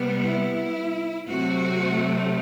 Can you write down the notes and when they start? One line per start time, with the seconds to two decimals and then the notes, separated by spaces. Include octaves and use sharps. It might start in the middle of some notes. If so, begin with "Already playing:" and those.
Already playing: C3 G3 B3
0.25 E4
1.29 C3 F#3 A3 C4 F#4